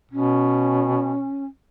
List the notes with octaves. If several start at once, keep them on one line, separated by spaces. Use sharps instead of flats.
B2 C#4